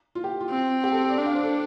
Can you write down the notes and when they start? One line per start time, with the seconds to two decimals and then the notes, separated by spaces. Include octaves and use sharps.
0.15 F4
0.24 G4
0.41 F4
0.50 C4
0.84 G4
0.92 A4
1.09 D5
1.18 D4 G5
1.26 F5
1.35 C5
1.44 A4